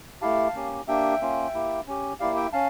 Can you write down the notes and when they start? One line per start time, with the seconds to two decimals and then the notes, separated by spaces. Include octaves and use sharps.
0.22 A3 E4 G4 F5 A5
0.55 A#3 C#4 G4
0.88 A#3 D4 G4 E5 G5
1.21 A#3 C#4 F4
1.54 A#3 E4 G4
1.87 C#4 G4
2.20 A#3 E4 G4 D5 F5
2.36 E5 G5
2.53 C#4 F5 A5